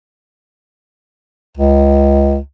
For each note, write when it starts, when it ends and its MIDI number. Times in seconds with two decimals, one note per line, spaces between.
1.57 2.38 37